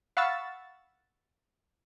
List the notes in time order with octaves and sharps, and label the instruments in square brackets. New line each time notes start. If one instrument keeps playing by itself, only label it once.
[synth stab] F5 F#5 B5 C#6 E6 A6